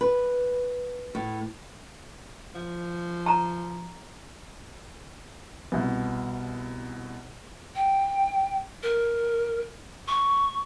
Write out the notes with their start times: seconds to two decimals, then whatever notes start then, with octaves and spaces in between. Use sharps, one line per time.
0.01 B4
1.15 A2
2.55 F3
3.26 A5 A#5
5.72 C2 B2
7.75 G5
8.83 A#4
10.08 C#6